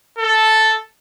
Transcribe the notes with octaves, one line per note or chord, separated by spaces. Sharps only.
A4